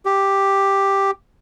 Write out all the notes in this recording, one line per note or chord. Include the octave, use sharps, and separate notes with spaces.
G4